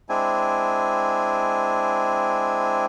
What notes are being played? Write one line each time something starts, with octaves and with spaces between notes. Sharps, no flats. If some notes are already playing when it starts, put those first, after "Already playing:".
G#3 C4 D4 E4 G#5